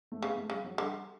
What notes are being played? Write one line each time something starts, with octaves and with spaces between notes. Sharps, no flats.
A3
C#3 B3
A3
C#3 G3
F#3
D3 G3